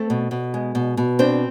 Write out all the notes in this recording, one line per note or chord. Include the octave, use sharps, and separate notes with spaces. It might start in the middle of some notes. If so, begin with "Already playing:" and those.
Already playing: A3 C4 A4
B2
B2
G#3
B2
B2
C4 D4 C5